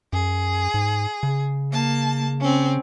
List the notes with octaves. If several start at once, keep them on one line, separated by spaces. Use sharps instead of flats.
F#2 G#4
G#2
C#3
A#3 A5
C4 C#4